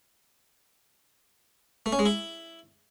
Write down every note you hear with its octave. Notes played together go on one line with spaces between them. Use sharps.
A3
C#4
G#3
E4